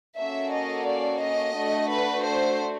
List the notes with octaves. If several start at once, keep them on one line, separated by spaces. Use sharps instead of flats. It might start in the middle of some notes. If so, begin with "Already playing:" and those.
A#3 C#4 F#4 A4 E5
D#5
D5
D#5
A3 D4 F#4
B4
C5